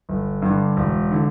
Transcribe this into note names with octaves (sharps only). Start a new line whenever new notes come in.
G1
G2 D3
E1
D3